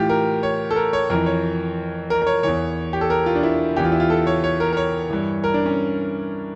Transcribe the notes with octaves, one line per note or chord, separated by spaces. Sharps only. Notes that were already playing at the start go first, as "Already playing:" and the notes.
Already playing: A2 E3 F4 G4
A#4
C#5
A4
A#4
C#5
F2 E3 A#4
C#5
A#4
A#4
C#5
E2 E3 C#5
G4
A4
A#4
F4
D4
E4
E2 E3 G4
F4
E4
F4
A4
C#5
C#5
A#4
A#4
C#5
G2 E3
A#4
D4
C#4